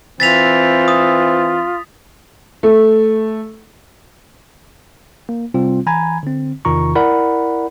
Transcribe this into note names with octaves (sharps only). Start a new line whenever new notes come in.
E3 C4 F4 A6 B6 F7
D#6
A3
A#3
C3 G3 C4 F4
E3 G#5 A#5 B5 G#6
D3 C4
E2 C3 D#3 F4 A#5 C#6
E4 A#4 D5 F#5 B5